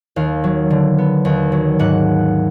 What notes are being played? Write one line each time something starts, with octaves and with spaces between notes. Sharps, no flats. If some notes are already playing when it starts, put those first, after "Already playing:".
D#2 F5
F#3
D3
B3
D#2
F#3
G#2 F#5